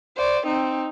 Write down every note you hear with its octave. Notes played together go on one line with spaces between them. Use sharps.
C5 D5
C4 D#4